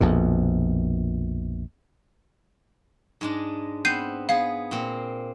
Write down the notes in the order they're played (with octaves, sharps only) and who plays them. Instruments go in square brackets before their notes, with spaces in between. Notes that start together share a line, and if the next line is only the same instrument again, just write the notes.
[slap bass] A#1 F2 B2
[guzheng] G#2 G#3 D4
[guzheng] B3 C4 [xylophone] G6 C7 D#7
[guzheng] B3 G#4 [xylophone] F5
[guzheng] A#2 C4